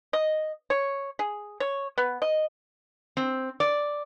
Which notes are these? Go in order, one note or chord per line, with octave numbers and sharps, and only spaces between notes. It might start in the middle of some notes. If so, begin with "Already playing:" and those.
D#5
C#5
G#4
C#5
B3
D#5
C4
D5